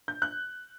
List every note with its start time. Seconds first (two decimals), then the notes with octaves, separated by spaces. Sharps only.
0.08 G6
0.22 F#6